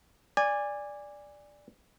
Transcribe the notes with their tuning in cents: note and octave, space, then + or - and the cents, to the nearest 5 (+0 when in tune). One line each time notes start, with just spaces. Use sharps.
D5 +0 G#5 -20